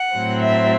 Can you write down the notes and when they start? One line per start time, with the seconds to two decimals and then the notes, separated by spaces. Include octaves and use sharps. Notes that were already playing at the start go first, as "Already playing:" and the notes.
Already playing: F#5
0.15 A2 F#3 C4
0.43 E5